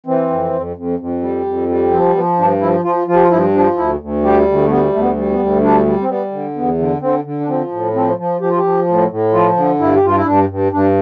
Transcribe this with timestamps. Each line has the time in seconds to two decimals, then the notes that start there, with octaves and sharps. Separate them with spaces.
0.06 E3 C4
0.30 F2
0.53 F2
0.76 F2
0.99 F2
1.22 G3
1.46 F2
1.68 G3
1.91 F3 C4
2.15 F3 B3
2.38 G2 D4
2.61 F3 E4
2.84 F3 F4
3.08 F3 F4
3.15 G4
3.22 F4
3.31 G2 E4
3.54 F3 D4
3.77 D2 E4
4.00 D2
4.23 G3 G4
4.47 D2
4.65 A3
4.70 G3 B3
4.92 D2 A3
5.01 B3
5.16 G3
5.32 B3
5.39 D2
5.62 G3 D4
5.86 G3
6.01 C4
6.09 G3 B3
6.31 D3
6.55 E2 B3
6.78 D3
7.01 D3 C4
7.24 D3
7.40 D4
7.48 F3 C4
7.71 A2
7.94 F3 C4
8.18 F3
8.41 F3 G4
8.50 F4
8.57 G4
8.64 F3
8.87 A2
9.10 A2
9.33 F3 F4
9.56 D3
9.79 G2 E4
9.96 G4
10.02 G2 F4
10.16 E4
10.25 G2 D4
10.49 G2
10.72 G2 D4